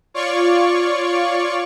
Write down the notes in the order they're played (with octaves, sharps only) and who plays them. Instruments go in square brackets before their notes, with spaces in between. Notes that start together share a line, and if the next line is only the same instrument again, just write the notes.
[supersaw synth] F4 C#5 D5 C#6